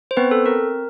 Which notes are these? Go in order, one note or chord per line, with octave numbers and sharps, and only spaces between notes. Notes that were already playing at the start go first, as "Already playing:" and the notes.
C5
B3 C4 B4
A4
C4 A#4